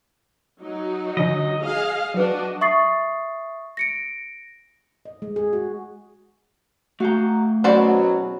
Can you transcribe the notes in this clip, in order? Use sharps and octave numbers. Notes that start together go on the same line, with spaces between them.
F#3 D#4
D3 F3 D#5
G#4 F5
F#3 D4 F#4 B4
E5 C#6 D#6 A6 C7
A#6 C#7 D7
D#5
G#3
G#4
F#4
A3 F#4 F5 G5 A#5
E2 B2 F#3 C4 C#4 F#4 D5 B5